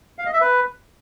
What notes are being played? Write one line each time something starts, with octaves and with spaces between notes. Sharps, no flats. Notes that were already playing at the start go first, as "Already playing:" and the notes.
F5
D#5
E5
B4